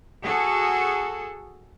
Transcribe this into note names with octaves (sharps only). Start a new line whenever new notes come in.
F#4 G#4 A4